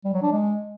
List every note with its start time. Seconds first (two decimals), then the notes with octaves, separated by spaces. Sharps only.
0.05 G3
0.14 F#3
0.23 D4
0.32 G#3